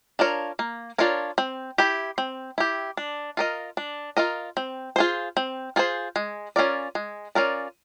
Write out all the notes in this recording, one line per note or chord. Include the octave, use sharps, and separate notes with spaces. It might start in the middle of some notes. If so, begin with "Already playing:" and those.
D4 F4 A#4 C#5
A#3
D4 F4 A#4 C#5
C4
E4 G4
C4
E4 G4
D4
F4 A#4 D#5
D4
F4 A#4 D#5
C4
F4 G#4 C5
C4
F4 G#4 C5
G#3
C#4 F4 A#4 D5
G#3
C#4 F4 A#4 D5